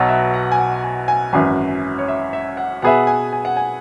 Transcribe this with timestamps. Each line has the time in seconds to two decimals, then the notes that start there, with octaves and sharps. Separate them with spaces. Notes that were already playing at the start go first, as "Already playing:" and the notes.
Already playing: B1 B2 F#3 B4
0.09 E5
0.34 F#5
0.52 G#5
0.58 F#5
0.83 G#5
1.08 G#5
1.33 G#1 F#2 E3 G#5
1.99 C#5
2.08 E5
2.33 E5
2.57 F#5
2.82 B2 B3 G#4 B4 E5 F#5
3.07 G#5
3.33 G#5
3.45 F#5
3.57 G#5